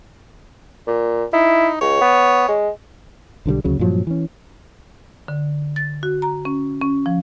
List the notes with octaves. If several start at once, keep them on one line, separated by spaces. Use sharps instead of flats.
A#2
D#4 E4
C#2 C#5
B3
G#3
B1 D3 E3 G3
D2 C#3 F#3
G2 A#2 F3 F#3
E3 C#4
D3
A6
F#4
A#5
C#4
C#4
F3